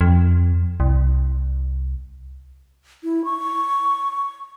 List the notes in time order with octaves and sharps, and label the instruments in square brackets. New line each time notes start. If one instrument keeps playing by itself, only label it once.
[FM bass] F2
C2
[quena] E4
C#6